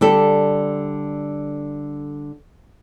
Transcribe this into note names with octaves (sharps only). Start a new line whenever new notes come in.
D3 G3 A4